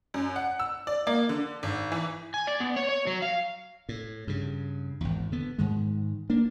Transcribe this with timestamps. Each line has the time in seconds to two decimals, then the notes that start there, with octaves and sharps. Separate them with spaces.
0.14 F#2
0.36 F#5
0.60 E6
0.87 D5
1.07 A#3
1.29 D3
1.63 G#1
1.92 E3
2.34 G#5
2.47 D5
2.60 B3
2.76 C#5
2.89 C#5
3.07 F#3
3.22 F5
3.89 A2
4.27 G2 C#3
5.01 G#1 E2
5.32 D3 B3
5.59 G#2 D#3 G#3
6.30 A#3 D4